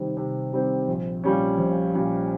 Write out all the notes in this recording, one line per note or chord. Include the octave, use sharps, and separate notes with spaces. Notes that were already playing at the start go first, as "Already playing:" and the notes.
Already playing: C3 D#3 G3 C4
C3
D#3 G3 C4
A#1
A#2 G3 C#4
A#1
A#2 G3 C#4